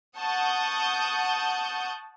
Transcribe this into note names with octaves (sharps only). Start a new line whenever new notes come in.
F#5 A5 C#6 D#6 G6